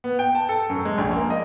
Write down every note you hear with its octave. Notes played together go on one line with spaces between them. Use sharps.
B3
G5
A5
A4
F#2
G#3
A#1
A#3
D#5